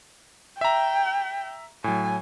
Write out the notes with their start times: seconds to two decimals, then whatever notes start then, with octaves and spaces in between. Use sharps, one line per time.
0.61 E5 G5 A#5
1.84 A2 F#3 G#5